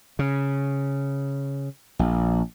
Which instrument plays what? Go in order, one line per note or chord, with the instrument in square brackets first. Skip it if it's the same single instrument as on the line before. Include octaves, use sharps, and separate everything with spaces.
[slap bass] C#3
A#1